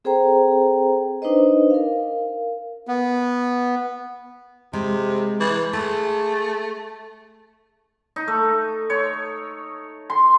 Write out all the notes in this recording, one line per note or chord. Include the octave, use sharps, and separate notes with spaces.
C4 G#4 A4 C5 G5 A#5
D4 D#4 B4 C5 D#5
A#4 F5
B3
C3 G#3
E3
A3 G#4
D#4
A3
C#5
C6